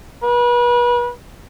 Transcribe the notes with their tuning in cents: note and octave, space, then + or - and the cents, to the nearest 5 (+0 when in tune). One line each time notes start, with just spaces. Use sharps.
B4 -35